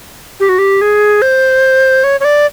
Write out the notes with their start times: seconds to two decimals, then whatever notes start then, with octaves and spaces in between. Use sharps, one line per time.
0.40 G4
0.49 F#4
0.59 G4
0.81 G#4
1.22 C5
2.04 C#5
2.20 C#5
2.25 D5